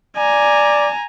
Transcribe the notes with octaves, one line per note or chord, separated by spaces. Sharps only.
D5 G#5 A#5